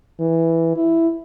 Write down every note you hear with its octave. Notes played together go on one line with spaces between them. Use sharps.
E3
E4